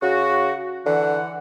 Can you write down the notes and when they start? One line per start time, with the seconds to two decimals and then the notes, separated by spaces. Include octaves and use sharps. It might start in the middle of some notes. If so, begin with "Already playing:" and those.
0.02 C#3 F#4
0.86 D3 E3 F#5